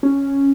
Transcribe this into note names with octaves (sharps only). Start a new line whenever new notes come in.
C#4